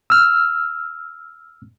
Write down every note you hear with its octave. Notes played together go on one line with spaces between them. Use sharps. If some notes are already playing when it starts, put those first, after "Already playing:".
E6 F6